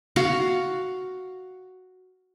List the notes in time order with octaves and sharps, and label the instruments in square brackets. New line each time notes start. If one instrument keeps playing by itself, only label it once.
[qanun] F#4 F5